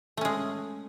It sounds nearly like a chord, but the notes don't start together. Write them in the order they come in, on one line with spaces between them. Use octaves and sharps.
A3 C#4 G#3